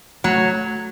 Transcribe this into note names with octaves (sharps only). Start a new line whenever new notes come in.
F#3 A3